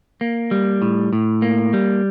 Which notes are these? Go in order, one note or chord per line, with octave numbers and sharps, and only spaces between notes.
A#3
G3
A2
A2
A#3
G3